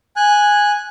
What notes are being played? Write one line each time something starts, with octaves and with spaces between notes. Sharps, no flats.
G#5 F#6